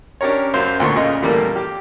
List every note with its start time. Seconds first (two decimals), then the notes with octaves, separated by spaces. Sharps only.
0.21 C#4 D4 G4 A#4 C#5
0.54 F#2 F#3 C5 F5 C6
0.80 D2 A#2 C6 C#6
0.96 A#2 C#3 D#5
1.22 E2 A#2 G3 A3 A#3
1.56 G4